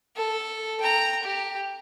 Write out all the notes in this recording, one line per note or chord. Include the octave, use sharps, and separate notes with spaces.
A4
G5 A#5
G4